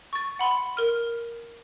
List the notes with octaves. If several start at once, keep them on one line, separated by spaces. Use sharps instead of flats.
C#6 A6
F#5 B5 C6
A#4 F6